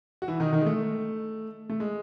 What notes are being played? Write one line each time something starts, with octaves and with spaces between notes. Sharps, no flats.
F#4
E3 E4
D#3 D#4
D#3 D#4
G#3
A3
A3
G#3